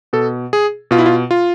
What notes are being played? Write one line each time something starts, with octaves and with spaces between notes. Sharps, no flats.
B2 A4
G#4
B2 F4
E4
F4
F4